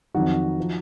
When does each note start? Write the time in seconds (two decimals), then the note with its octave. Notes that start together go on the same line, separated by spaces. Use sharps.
0.14 F2 D#3 F#3 D#4 F#4
0.60 F3